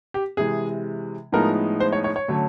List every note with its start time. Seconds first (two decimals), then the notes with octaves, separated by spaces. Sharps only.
0.14 G4
0.37 C3 E3 G#3 G#4
1.32 A2 F3 G#3 B3 D#4 A#4
1.80 C5
1.93 C#5
2.04 C#5
2.16 C#5
2.28 D3 F#3 A3 C#4